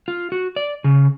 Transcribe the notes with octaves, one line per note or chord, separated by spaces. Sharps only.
F4
F#4
D5
C#3